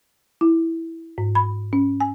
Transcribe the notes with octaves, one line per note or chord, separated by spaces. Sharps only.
E4
G#2
B5
C#4
G#5